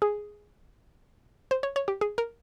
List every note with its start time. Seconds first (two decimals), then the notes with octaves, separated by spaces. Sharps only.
0.02 G#4
1.51 C5
1.63 C#5
1.76 C#5
1.88 G4
2.01 G#4
2.18 A#4